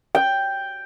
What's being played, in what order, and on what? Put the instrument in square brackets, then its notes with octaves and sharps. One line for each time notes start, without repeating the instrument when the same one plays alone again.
[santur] G5